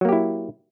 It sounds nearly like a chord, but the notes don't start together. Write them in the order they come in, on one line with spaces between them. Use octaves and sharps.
F#3 A#3 G4 E4